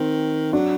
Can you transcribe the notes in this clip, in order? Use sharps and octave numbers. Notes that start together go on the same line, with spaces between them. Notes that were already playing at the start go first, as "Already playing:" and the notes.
Already playing: D#3 C4
F#3 D4